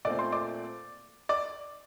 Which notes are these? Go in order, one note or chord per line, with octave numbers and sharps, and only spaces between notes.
A#2 A3 C4 D5 D6
C5 C6
D5 D6
D5 D6